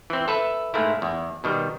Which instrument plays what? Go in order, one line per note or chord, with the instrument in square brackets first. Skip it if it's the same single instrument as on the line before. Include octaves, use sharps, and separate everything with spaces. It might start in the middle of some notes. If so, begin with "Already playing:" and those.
[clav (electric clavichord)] E3 C4
A4 B4 E5
G#2 A3 A#3 E4
E2
B2 D#3 G3